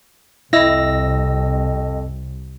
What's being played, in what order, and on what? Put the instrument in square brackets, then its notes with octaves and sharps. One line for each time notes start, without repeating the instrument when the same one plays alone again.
[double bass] C2 [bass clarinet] F2 [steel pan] E4 [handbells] D#5 E6 A#6